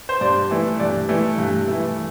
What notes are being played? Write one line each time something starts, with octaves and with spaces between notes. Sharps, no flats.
C5
G2 D5
E3 A3
G2 D5
E3 A3
G2
E3 A3